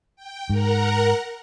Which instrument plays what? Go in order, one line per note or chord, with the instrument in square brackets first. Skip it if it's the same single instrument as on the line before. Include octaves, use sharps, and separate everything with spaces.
[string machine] G5
[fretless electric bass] G#2 [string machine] A#4 F#5 A#5